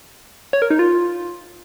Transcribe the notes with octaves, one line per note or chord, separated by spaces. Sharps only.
C#5
A#4
D#4
F4